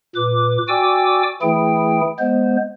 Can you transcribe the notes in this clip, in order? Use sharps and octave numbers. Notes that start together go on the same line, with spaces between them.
A#2 B4 D6
F#4 D5 G5 G#5 D6 E6
E3 A3 E4 G#4 G5
G#3 B3 C5